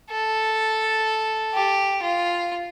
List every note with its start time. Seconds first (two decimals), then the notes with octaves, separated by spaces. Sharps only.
0.10 A4
1.54 G4
2.02 F4